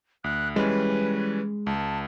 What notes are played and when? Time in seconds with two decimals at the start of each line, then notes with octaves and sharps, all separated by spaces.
0.24 D2 F#6
0.56 E3 G3 G#3 C#4 B4
1.67 C#2 A5